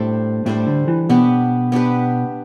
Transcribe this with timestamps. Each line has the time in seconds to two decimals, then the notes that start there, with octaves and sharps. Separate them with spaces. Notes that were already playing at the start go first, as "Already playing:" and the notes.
Already playing: A2 G3 D4 A4 C5
0.46 A2 G3 D4 A4 C5
0.67 D3
0.88 E3
1.09 B2 B3 D4 G4 B4
1.72 B3 D4 G4 B4